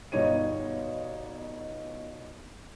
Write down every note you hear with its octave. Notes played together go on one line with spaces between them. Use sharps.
G1 B2 G3 D#4 C#5 D#7